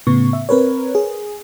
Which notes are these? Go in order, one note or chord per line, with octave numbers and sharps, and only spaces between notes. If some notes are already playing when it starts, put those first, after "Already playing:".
A2 C#3 B3 C#6
E5
C4 A#4 B4 C#5
G#4